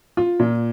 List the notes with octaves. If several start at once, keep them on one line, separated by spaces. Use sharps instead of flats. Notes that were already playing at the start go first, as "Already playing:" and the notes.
F4
A#2